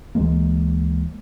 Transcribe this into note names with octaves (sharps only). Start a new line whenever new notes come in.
D2 E3 G#3 A#3